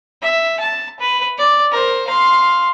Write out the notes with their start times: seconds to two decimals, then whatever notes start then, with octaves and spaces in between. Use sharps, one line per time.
0.22 E5
0.60 A5
1.00 B4
1.38 D5
1.72 A#4 C5
2.07 F5 C6